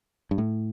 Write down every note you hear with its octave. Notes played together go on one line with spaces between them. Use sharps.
G2
A2